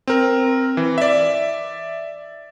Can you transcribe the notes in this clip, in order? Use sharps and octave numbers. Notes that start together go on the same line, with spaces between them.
C4 A#4
E3
D5 E5